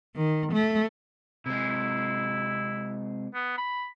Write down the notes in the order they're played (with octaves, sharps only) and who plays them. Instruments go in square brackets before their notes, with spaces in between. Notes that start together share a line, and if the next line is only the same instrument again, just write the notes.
[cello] D#3
A3
[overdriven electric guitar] C3 G#3 [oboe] E4
[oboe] B3
B5